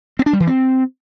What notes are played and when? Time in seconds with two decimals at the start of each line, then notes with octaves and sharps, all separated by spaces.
0.19 C4
0.26 D4
0.33 G3
0.40 E3
0.47 C4